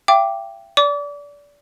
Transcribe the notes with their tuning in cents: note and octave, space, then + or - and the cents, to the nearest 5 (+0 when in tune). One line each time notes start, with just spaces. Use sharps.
E5 +45 G5 +0 D6 +0
D5 -25 D6 -35